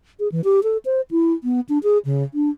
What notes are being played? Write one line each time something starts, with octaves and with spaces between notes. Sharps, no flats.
G#4
E3
G4
A4
C5
E4
B3
D4
G#4
C#3
D4